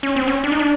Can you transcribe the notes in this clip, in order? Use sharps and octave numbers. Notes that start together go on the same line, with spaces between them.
C#4
C4
C#4
D4
D#4
D4